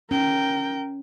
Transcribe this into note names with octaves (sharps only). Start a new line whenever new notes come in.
C#4 A#4 G5